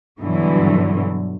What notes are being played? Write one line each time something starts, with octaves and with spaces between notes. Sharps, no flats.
G2 B2 D3 E3 F#3